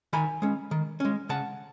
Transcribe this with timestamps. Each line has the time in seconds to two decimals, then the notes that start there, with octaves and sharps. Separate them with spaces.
0.13 D#3 G#5 B5
0.42 G#3 C#4
0.71 D#3
1.00 G#3 C#4
1.29 C#3 F#5 A5